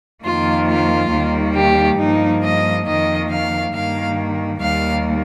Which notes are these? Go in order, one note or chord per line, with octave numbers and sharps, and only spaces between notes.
F2 D#3 A#3 F4
F4
D#2 D#3 G3 A#3
G4
G2 F3 A#3 D#4
D#5
F2 D#3 A#3 D#5
F5
G2 D#3 A#3 F5
D#2 D#3 G3 A#3 F5